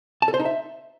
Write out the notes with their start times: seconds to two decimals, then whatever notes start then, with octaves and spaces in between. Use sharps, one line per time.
0.22 A5
0.28 A4
0.34 C5
0.40 D#4
0.45 E5